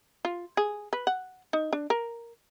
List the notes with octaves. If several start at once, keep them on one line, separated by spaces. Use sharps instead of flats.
F4
G#4
B4
F#5
D#4
D4
A#4